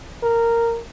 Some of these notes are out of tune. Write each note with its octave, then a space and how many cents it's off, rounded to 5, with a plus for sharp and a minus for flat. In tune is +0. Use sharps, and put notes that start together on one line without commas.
A#4 -10